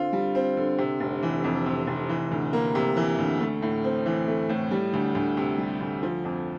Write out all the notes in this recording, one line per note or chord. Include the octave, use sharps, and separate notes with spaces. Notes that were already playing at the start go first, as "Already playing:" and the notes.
Already playing: D3 C4 F4
G3
C4
D3
C3
F1
E3
F2
C3
F1
E3
D2
A#3
C3
E3
D2
A3
A2
C4
E3
A3
A2
G3
D2
D2
C3
G3
D2
F3
F2